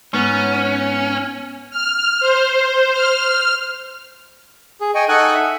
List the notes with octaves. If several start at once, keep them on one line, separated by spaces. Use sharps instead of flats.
G#2 B3 C#4
F6
C5
F6
G#4
D#5 G5 G#5 C#6
D#4 A4 F#5 G#5 C#6 F#6
E5